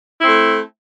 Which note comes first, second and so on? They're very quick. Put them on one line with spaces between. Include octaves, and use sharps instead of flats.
E4 C4 A3